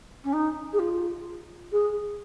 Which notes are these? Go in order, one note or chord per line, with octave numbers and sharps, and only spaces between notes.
C#4
D#4
G#4
F4
G#4